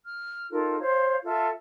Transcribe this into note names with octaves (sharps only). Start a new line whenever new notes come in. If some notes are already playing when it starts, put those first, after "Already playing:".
F6
D#4 F4 A4 A#4
C5 C#5 F5
F4 A4 E5